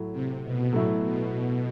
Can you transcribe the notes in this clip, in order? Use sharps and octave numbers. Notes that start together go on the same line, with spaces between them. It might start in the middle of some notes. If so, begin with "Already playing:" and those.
Already playing: A2 F#3 A3 E4
C3
B2
A2 F#3 A3 E4
B2
B2